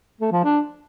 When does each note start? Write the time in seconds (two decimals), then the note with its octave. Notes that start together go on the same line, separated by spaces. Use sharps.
0.20 A3
0.32 F3
0.44 D4